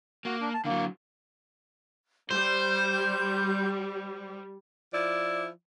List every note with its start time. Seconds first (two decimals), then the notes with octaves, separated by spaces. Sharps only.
0.25 A#3 F#4
0.41 D4
0.54 A5
0.65 D3 F#3 A#3
2.31 G3 C5 G6
4.93 F3 E4 D5